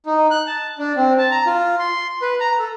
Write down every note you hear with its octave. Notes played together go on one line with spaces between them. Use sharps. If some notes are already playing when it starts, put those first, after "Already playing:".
D#4
F#6
A5
D4
C4
A5
A#5
F4
C6
B4
A#5
A4